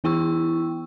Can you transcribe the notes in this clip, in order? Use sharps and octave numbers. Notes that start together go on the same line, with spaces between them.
E3 B3 E4 G5 C#6 E6